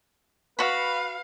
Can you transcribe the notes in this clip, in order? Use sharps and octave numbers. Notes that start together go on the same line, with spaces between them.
F#4 B4 F5 B5